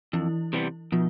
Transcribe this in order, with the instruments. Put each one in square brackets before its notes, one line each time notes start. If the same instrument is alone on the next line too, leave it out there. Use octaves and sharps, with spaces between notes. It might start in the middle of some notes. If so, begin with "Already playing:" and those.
[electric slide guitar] F2 [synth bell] E3 E4
[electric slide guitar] C3 E3 G3 B3
[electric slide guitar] B2 [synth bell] F3 F4